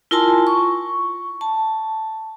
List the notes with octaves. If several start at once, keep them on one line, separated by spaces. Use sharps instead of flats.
E4 F4 A#4 G#5 A5 C6
C#6
A5